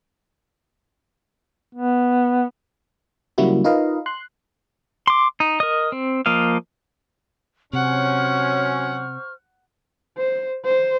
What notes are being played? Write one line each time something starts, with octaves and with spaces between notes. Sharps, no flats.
B3
C#3 F#3 G3 A#3 E4 F#4
D#4 F4 A#4 B4 D#5 F5
C6 F#6
C6 D6
D#4
A#4 D#5
C4
F3 A#3 D#5 F5
C3 F#3 C#4 C5 F#5 C#6 F6
C5
C5